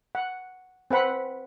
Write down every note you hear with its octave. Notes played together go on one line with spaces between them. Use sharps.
F#5
C4 B4 F#5 B5